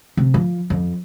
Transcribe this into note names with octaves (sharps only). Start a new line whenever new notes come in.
C3
F3
F2